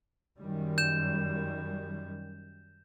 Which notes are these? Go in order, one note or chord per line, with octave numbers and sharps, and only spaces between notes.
F#2 D#3 G3
G6 E7